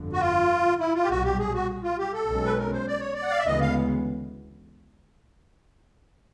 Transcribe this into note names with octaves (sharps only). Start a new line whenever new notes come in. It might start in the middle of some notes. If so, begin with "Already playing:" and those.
Already playing: G1 F2 D3
F#4
F4
E4
F4
G4
B1 A#2 G3 F#4
G4
G#4
F#4
F4
G4
A4
B1 B2 G#3 C#4
B4
A#4
C5
D5
C#5
D5
F#5
F5
E5
D2 C#3 E3 G#3 B3 D#5
F5